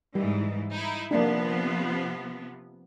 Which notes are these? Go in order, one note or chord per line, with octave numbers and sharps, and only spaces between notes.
G#2 E3 G3
D#4 E4
C3 F3 A#3 B3 D4